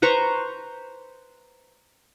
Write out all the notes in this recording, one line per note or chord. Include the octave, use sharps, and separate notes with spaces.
B4 C5 A#5 C#6